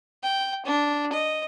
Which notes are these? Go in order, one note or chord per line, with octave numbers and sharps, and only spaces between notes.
G5
D4
D#5